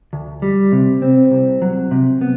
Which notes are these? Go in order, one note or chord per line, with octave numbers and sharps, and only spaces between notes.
D2
G3
C3
C4
C2
F#3
C3
B3